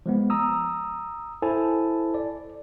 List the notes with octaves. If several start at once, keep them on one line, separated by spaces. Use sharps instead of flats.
F3 G#3 B3
A#5 D#6 E6
E4 A4 C5 G#5 A5
D5